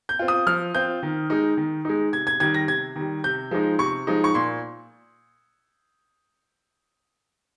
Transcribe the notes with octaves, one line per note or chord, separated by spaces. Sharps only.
G6
C4 F4
D#6
F3 F6
C4 F4 G6
D#3
G#3 D#4
D#3
G#3 D#4
C3 G#6
G#6
D#3 G3 G#6
A#6
C3 G#6
D#3 G3
C3 G6
F3 G#3 D#4
C3 C#6
F3 G#3 D#4
C#6
A#2 C6